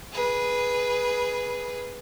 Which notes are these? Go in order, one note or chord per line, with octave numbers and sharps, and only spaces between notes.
G#4 B4